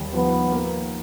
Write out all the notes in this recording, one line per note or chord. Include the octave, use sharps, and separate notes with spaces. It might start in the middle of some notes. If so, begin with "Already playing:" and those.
Already playing: D#2 G3
F3 B3
A#3